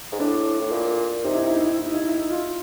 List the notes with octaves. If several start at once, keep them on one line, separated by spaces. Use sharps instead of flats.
G#2
A2 D4
A2
A#2
C3 D#4
E4
D#4
E4
D#4
E4
D#4
E4
D#4
E4
D#4
E4
D#4
F4